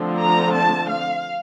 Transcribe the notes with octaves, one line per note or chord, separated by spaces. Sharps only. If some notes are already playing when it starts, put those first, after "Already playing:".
Already playing: D3 F3 A3 C4
A#5
A5
F5